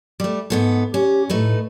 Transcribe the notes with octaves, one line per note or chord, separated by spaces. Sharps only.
G3 A3
G#2 B3 A4
C#4 G4
A2 A3 D#4 B4